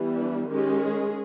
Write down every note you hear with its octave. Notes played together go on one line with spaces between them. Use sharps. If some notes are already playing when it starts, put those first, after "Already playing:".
Already playing: E3 G3 B3
D4
D#3 G#3 C#4 G4
G#4